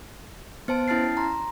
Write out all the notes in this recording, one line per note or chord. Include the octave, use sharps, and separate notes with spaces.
B3 C5 A5 D7
C#4 E4 A5 F6 A6 C7
A#5 C6